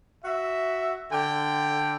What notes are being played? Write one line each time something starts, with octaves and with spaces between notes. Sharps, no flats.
F#4 E5
D3 G5